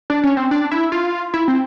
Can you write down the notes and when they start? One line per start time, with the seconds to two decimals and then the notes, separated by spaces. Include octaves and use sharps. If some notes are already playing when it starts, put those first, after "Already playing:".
0.10 D4
0.23 C#4
0.37 C4
0.51 D4
0.71 E4
0.92 F4
1.34 E4
1.48 C4